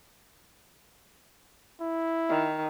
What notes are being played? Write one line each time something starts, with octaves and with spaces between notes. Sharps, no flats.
E4
D#3